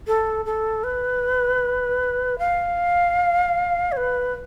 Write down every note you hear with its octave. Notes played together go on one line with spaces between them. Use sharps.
A4
A4
B4
F5
C#5
B4